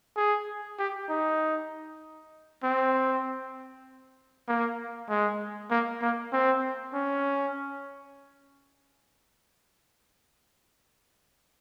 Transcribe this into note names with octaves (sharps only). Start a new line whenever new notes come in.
G#4
G4
D#4
C4
A#3
G#3
A#3
A#3
C4
C#4